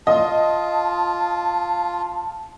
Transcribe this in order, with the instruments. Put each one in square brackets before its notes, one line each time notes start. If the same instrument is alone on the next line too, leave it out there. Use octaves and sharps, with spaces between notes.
[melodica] F4 [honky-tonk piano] D#5 [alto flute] A5